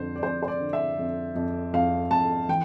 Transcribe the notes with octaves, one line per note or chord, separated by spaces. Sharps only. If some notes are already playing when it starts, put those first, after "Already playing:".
Already playing: F2 D3 C5
D5
F2 C5
C5
D5
D3
E5
F2
F2
F2 F5
F2 A5
E3 G5